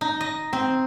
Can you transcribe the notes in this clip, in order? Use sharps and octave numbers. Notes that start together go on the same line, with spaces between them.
D#4
D#5
C4